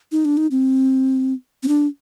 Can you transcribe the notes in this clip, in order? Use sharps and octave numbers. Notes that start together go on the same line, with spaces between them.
D#4
D4
D#4
C4
C4
D4